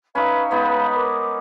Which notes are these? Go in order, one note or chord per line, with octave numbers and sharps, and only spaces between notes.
C#4 D#4 B4 E5 F5
G#3 B3 D#4 B4
A#4 D6